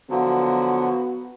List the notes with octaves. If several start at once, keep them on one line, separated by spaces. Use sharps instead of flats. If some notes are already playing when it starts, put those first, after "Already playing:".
D3 F3 F#3 B3 F#4 B4